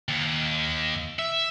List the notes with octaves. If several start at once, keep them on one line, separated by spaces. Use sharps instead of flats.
D#2
E5